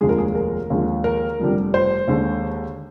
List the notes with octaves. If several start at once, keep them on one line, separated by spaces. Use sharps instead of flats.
F1 D#2 D3 F3 G#3 G#4
A#4
G#4
A#4
D#2 D3 F3 G#3
A#4
F1 F2 D3 G3
C5
D#2 D3 G#3